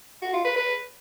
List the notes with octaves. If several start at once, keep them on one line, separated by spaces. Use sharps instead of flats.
F#4
F4
B4
B4